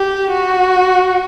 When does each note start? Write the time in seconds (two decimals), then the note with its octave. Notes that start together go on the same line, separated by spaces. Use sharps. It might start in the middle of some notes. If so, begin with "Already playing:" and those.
Already playing: G4
0.32 F#4